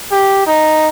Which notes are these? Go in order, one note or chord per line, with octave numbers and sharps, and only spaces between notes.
G4
D#4